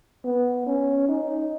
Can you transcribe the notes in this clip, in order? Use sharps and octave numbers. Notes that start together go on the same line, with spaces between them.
B3
C#4
D#4